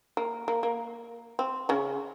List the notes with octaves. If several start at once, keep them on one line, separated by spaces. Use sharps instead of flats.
A#3
A#3
A#3
C4
C#3 C#4